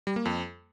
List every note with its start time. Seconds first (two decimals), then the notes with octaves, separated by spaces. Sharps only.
0.07 G3
0.16 A#3
0.25 F2